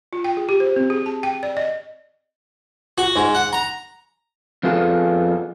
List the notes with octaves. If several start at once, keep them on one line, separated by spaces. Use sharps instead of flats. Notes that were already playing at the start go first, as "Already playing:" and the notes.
F4
G5
G#4
G4
C5
C4
G#4
A5
G5
D5
D#5
F#4
G#2
F#5
A#5
F2 B3 F4 G#4 A4